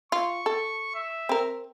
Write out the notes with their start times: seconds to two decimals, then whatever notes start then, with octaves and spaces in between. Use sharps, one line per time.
0.12 F4 C#6
0.46 A4
0.95 E5
1.29 C4 A#4